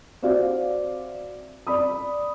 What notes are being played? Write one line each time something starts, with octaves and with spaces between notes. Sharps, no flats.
C4 F#4 D5 E5 F5
D5 B5 D#6